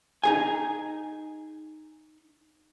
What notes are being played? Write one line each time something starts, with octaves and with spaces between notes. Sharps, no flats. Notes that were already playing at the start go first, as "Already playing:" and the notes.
D#4 G#4 G#5